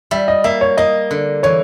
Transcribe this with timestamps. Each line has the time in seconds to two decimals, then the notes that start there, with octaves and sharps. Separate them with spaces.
0.11 G3 E5
0.28 D#5
0.44 A#3 E5
0.61 C#5
0.77 A#3 D#5
1.11 D3
1.43 E3 C#5